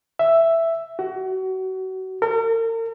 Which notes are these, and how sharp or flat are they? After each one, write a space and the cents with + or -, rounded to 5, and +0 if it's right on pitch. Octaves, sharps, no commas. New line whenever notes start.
E5 +5
F#4 +30
A#4 -40